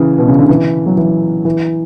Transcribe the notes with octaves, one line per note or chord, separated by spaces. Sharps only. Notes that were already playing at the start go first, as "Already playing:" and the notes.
Already playing: C#3 E3
B2
C#3
D3
E3
F#3
E3
E3